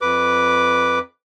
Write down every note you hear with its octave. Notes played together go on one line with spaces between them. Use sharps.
F2 B4 D6